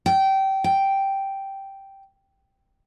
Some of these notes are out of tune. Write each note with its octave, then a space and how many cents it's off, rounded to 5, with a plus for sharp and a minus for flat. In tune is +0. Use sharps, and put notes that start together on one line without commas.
G5 -20
G5 -5